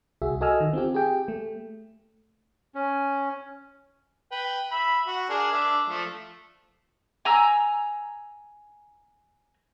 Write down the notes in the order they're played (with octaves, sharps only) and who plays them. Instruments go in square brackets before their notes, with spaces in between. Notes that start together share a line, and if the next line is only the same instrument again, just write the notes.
[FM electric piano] C2 F#4 G#4 E5
F#4 A4 D#5 G#5 E6 F6
D#3
C4 F4 G4
G4 G#4 G5
A3
[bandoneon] C#4
[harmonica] B4 G5
E5 B5
F#4
D4 G#4 A#4
D4 E5
F3 A3
[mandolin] G#5 A#5 E6